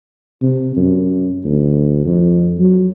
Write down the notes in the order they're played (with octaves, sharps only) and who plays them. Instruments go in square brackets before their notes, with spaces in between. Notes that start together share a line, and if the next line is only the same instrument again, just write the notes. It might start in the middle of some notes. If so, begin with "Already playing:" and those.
[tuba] C3
F#2
D2
F2
F#3